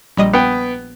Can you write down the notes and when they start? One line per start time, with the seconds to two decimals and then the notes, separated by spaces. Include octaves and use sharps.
0.17 A#1 G3 D#5
0.33 B3 G5